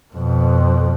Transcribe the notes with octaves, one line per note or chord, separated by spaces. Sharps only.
F2 B2